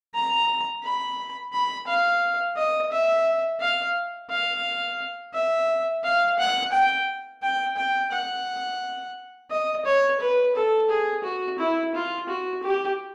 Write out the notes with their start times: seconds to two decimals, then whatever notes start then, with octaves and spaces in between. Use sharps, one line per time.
0.14 A#5
0.83 B5
1.53 B5
1.87 F5
2.56 D#5
2.92 E5
3.60 F5
4.30 F5
5.34 E5
6.04 F5
6.39 F#5
6.73 G5
7.43 G5
7.77 G5
8.12 F#5
9.51 D#5
9.86 C#5
10.21 B4
10.56 A4
10.89 G#4
11.24 F#4
11.59 E4
11.95 F4
12.29 F#4
12.63 G4